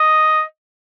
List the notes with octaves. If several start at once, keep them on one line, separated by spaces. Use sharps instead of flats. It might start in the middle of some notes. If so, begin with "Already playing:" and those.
Already playing: D#5